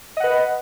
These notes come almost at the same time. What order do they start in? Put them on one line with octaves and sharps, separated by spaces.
D#5 F#5 B4